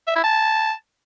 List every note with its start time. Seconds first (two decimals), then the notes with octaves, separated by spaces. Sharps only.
0.07 E5
0.16 E4
0.24 A5